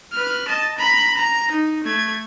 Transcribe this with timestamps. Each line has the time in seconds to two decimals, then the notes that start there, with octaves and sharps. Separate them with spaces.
0.12 B4 F6
0.48 D#5 A5
0.78 A#5 B5
1.16 A#5
1.52 D#4
1.84 A3 G#6